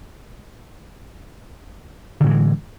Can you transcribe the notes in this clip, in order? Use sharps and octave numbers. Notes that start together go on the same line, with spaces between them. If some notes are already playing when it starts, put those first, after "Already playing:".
A2 D3 E3 G#3